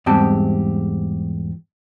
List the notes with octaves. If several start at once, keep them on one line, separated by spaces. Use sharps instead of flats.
E2 G#2 G3 C4 G4 A5